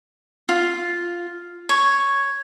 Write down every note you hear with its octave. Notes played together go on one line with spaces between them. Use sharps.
F4
C#5